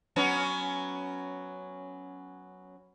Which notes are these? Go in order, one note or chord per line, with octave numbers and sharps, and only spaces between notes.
F#3 B3 C#4